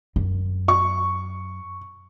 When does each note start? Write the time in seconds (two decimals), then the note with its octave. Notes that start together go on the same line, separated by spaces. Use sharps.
0.16 F#2
0.68 C#6